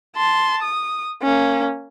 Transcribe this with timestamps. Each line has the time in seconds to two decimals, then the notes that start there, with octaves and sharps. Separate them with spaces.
0.16 A5 C6
0.62 D#6
1.22 A#3 C#4